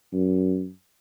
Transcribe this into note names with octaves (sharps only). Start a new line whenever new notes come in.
F#2